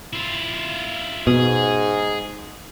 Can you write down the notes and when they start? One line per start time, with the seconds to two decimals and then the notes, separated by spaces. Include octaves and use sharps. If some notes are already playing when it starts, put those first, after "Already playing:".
0.13 E4 F4
1.27 G#2 B2 G#4